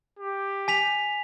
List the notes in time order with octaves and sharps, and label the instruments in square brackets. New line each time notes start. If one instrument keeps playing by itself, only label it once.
[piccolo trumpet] G4
[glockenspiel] G#5 B6 F7